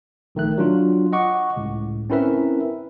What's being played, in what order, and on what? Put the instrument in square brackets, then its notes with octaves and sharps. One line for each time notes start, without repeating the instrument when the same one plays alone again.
[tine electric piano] A#1 D#3 A3 F#6
F#3 D4 F4
D#5 F#5 C#6 D6
C#2 A2
C4 C#4 E4 A#4 B4 E5